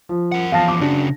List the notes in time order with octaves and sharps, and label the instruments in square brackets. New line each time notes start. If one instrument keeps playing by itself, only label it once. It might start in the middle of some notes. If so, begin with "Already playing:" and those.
[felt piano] F3
[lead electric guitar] A#4 F#5
[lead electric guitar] E2 F3 [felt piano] F5 A5 A#6
[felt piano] D6
[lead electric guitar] C#3 F#4 [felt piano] D4